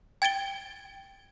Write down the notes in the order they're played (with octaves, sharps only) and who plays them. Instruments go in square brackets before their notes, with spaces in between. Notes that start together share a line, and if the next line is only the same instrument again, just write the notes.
[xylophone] G5 G#6 A6 D7 G7